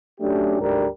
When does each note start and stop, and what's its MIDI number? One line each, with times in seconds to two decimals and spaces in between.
0.20 0.60 54
0.20 0.60 57
0.20 0.60 61
0.20 0.60 62
0.20 0.60 67
0.60 0.85 38
0.60 0.85 44
0.60 0.85 55
0.60 0.85 62
0.60 0.85 70